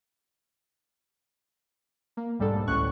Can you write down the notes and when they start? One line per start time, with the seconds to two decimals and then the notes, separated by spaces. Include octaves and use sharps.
2.17 A#3
2.39 B1 G#2 G3 D4 A4
2.67 A1 D2 A2 C#4 C#6 F#6